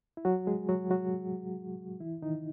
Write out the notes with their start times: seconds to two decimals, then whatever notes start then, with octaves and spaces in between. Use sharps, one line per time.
0.17 E4
0.25 F#3 F#4
0.47 G#3 G#4
0.69 F#3 F#4
0.91 F#3 F#4
2.00 E3 E4
2.22 D#3 D#4